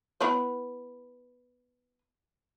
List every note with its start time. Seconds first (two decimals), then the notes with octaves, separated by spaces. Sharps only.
0.21 B3 E4 B4